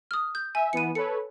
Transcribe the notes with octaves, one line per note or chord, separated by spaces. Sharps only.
D#6 F6
G6
E5 G#5
E3 B3 C#7 D#7
A4 B4 C#5 C#7